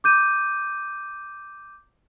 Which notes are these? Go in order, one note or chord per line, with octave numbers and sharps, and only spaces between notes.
D6 G6 D#7